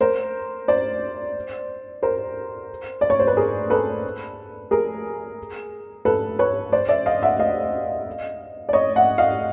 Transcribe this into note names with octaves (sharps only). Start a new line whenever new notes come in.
A#4 C5
C5 D5
A#4 C5
D5
C#5
C5
B4
G#4 A#4
A4 B4
G#4 A#4
A4 B4
B4 C#5
C5 D5
D5 E5
D#5 F5
E5 F#5
D#5 F5
D5
C#5 D#5
E5 F#5
D#5 F5